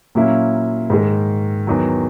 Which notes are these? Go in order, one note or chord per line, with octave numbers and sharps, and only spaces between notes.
A#2 F#3 A#3 C#4 E4
G#2 D#3 G#3
E2 D#3 F#3